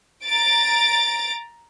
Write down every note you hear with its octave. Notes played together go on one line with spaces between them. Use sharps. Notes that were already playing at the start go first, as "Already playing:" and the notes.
A#5 A6 D7